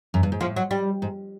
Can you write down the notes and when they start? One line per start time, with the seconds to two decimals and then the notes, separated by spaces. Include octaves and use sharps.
0.14 F#2
0.23 G2
0.32 G#2
0.41 A2 F3
0.56 F#3
0.71 G3
1.02 G#2